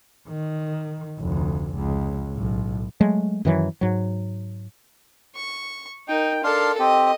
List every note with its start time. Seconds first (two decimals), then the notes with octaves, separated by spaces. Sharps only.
0.28 D#3
1.20 F1 D2
1.75 C#2
2.33 B1 A2
3.01 F#3 G#3 A3
3.45 F#2 D#3 E3 F#3
3.81 G#2 F#3
5.35 C#6
6.08 D#4 A#4 G5
6.44 D4 A4 A#4 F5 C6
6.80 C4 G4 D#5